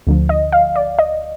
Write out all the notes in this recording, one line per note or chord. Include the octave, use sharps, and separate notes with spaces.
D2 D3 F3
D#5
F5
D5
D#5